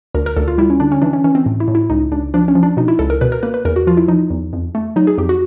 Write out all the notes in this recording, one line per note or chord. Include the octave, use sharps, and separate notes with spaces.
D2 A#4
A#4
D2 A4
F4
G3 E4
C#4
D3 D4
C#4
E3 D4
C#4
E3 C#4
C4
A2
E4
A2
E4
C#2 D#4
C#2 D4
F3 D4
C#4
F3
D4
B2 D#4
E4
C#2 A4
A#4
B2 B4
A#4
A#3 B4
B4
E2 A#4
F#4
F3 F4
E4
F3 D#4
E2
F2
A3
F#3 D#4
G#4
F2 G4
F#4